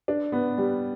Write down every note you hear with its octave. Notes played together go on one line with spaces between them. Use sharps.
D4
B3
G3